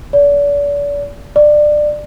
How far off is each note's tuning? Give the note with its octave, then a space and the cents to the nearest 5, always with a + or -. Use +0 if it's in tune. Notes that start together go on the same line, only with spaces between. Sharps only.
D5 -40
D5 +20